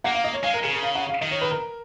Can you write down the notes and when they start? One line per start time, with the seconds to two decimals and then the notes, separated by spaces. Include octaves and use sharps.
0.04 A#3 F#5
0.15 F5
0.24 D#5
0.34 C#5
0.43 G#3 F5
0.54 A#4
0.63 C#3 G#4
0.73 A#4
0.83 F5
0.95 F#5
1.09 F5
1.21 D#3 D#5
1.31 C#5
1.41 B4
1.51 A#4